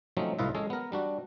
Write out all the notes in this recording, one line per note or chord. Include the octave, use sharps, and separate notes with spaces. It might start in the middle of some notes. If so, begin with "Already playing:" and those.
F3 F#3 A3 C4 C#4 D#4
C2 A2 F4 B4 D#5 E5
G#3 C#4 G#4 A4
B3 A#4
G3 D4 F#4